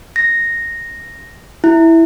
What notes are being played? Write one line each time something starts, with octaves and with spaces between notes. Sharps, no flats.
A#6
E4